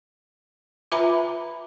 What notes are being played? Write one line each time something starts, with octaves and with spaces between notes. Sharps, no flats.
F4 B4 E5 G#5 A#5 B5